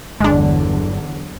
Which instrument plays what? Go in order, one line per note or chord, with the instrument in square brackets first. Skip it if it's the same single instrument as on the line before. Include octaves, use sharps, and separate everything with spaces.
[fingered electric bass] G1 [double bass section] E2 D3 F#3 [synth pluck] G#3 D4